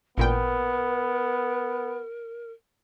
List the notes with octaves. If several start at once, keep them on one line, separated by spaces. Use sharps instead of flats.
A1 A#2 B3 A#4 G5